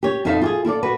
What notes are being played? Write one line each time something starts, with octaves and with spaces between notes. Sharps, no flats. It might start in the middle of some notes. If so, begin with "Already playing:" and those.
G4 C#5
F2 D#4 A4 E5 F5
F4 G4 G#4
E4 F4 A4 D5
F#4 B4